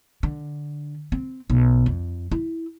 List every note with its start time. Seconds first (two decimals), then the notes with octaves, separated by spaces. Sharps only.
0.23 D3
1.12 C4
1.50 B1
1.86 F2
2.31 E4